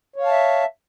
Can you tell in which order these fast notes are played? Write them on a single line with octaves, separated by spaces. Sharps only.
C#5 F5 A5 E5